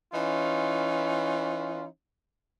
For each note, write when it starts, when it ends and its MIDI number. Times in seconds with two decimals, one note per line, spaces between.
0.13 1.86 52
0.13 1.86 61
0.13 1.86 63
0.13 1.86 65